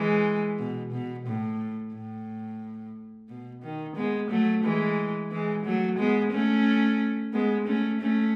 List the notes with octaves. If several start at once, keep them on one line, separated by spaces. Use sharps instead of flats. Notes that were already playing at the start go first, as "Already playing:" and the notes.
Already playing: E3 G#3
B2
B2
A2
A2
B2
D#3
G#3 B3
F#3 A3
E3 G#3
E3 G#3
F#3 A3
G#3 B3
A3 C#4
G#3 B3
A3 C#4
A3 C#4